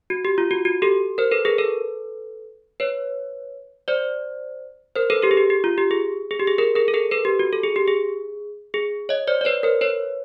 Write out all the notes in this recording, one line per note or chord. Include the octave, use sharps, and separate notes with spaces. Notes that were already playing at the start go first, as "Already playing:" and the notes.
F#4
G4
F4
F#4
F#4
G4 A4
A#4 C5
A4 B4
G#4 A#4
A4 B4
B4 C#5
C5 D5
A#4 C5
A4 B4
G4 A4
G#4
G4
G4
F4
G4
G#4
G#4
G4
G#4
G#4 A#4
G#4 A#4
A4
G#4 A#4
A4 B4
G4
F#4
A4
G#4
G4
G#4
G#4
C#5 D#5
C5 D5
D5
B4 C#5
A#4 C5
B4 C#5